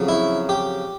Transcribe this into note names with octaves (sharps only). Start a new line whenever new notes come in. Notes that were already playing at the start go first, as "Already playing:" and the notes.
Already playing: F2 C#3 F#3
E4
G4